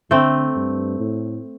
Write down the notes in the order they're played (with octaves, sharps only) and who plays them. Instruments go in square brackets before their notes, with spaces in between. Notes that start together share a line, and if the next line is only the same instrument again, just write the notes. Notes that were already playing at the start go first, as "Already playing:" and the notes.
[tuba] D3 [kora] A3 C4
[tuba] G2
A2